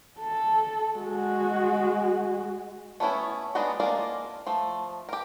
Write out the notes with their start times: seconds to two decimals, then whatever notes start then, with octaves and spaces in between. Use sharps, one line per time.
0.20 A4
0.96 G#3 F#4
3.00 A3 B3 C#4 E4
3.55 G#3 B3 D4 D#4 F#4
3.80 G#3 A#3 D4 F4 A#4
4.47 F3 A3
5.09 G4 A#4